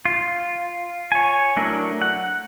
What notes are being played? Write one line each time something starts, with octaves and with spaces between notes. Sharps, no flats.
F4
C#5 G#5
F#3 A3 D4 E4 A#4
F#5